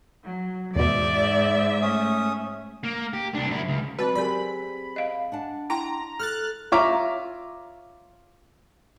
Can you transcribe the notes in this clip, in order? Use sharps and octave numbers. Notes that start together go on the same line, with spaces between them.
F#3
E2 G#2 B2 D5 E5
A3 C#4 D#6
A#3
G4
C2 D4
F#2 E4
C#2
F#3 C4 F#4 B4
C4 G4 G#4 A#4 D5 B5
D#5 F5
D4 F#5 A5
E4 G5 A#5 C6
A4 F6 F#6 A6
F4 C#5 E5 A#5 D6